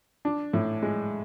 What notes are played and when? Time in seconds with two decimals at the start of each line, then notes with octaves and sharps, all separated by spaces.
0.25 D4
0.53 A2
0.83 G#3